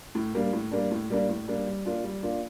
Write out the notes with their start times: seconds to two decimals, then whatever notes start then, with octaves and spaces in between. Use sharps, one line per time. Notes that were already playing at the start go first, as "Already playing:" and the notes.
0.15 A2
0.35 G3 A#3 D4
0.53 A2
0.72 G3 A#3 D4
0.91 A2
1.10 G3 A#3 D4
1.29 A2
1.48 G3 A#3 D4
1.66 G3
1.86 A#3 D4 F4
2.04 G3
2.23 A#3 D4 F4